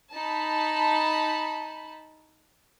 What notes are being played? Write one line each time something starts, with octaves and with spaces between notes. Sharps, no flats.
D#4 A5 B5